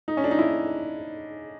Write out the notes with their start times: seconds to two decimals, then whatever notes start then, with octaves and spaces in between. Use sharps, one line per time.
0.08 D#4
0.17 C#4
0.24 D4
0.31 D#4
0.39 E4